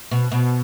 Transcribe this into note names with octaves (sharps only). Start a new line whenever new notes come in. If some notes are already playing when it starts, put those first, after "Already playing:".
B2
B2